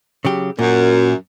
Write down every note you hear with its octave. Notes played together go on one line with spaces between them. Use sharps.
C#3 F#3 G4
F#2 A#2